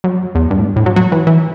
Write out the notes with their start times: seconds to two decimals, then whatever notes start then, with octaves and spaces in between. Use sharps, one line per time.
0.04 F#2
0.35 E2
0.51 G2
0.59 A2
0.65 G2
0.76 A2
0.86 F#3
0.96 F#3
1.12 E3
1.27 E3